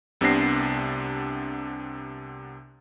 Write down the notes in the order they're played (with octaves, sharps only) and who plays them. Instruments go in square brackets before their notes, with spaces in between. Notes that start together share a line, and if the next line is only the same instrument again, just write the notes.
[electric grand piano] C2 C3 B3 D4 A#6 C7